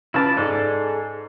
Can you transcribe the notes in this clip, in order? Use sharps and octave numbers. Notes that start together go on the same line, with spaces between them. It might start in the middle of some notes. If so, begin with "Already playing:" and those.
C#3 E4 F4 B4 A5 D6
G#2 G#4 A4 D5